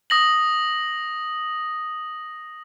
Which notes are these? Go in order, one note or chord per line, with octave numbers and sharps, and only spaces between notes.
D#6 A#6 F#7